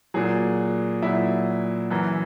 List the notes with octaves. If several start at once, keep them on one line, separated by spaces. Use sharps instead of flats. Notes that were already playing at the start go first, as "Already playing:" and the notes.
A#2 F#3 G#4
A#2 F#3 E4
F#2 E3